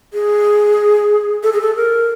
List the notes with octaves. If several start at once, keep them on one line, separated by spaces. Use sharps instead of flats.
G#4
A4
G#4
A4
A#4